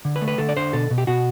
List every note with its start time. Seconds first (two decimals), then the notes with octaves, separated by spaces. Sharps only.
0.05 D3
0.16 B4
0.22 A3
0.28 B4
0.38 D3 A4
0.49 D5
0.56 D3 C5
0.73 B2 A4
0.91 B2
0.98 G4
1.07 B2 F#4